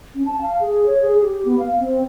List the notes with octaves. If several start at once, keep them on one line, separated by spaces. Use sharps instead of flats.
C#4
A5
F5
G#4
C#5
G#4
G4
B3
F5
C4